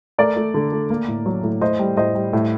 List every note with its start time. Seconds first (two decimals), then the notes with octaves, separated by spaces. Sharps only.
0.18 A3 A#4 D5
0.36 A3
0.54 D3
0.72 A3
0.90 A#3
1.08 A2
1.26 F#3
1.44 A2
1.61 A2 C5 D#5
1.79 G3
1.97 A2 C5 D#5
2.15 G3
2.33 A2